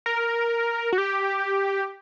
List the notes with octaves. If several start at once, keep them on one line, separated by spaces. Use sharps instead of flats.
A#4
F#4
G4